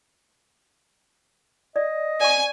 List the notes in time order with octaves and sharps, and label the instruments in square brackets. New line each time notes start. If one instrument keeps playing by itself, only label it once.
[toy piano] D5 [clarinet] D#5
[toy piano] D5 C#6 [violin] G#5